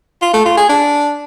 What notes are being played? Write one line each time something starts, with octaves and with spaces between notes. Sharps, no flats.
F4
A3
F4
G#4
D4